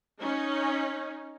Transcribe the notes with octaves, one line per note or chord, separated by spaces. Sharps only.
C#4 D#4